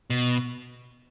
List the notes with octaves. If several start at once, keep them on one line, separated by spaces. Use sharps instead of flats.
B2